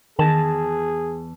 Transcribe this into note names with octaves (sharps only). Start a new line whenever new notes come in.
E2 D#3 G#4 A5